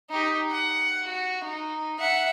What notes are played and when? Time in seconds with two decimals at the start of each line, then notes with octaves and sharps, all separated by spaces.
0.10 D#4 G4
0.51 F#5
1.03 F#4
1.44 D#4
1.99 E5 F#5